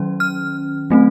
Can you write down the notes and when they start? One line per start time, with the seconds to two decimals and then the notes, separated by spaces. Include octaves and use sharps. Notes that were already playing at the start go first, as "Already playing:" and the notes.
Already playing: D#3 F#3 C#4
0.20 F6
0.90 F#3 A3 C4